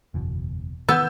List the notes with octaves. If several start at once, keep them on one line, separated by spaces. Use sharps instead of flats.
F#1 E2 B2
D#3 E3 B3 E6 G6